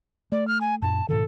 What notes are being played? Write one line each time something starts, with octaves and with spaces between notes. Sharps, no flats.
A3 D5
F6
G#5
F#2 A#2 A5
G#2 B2 D#3 A4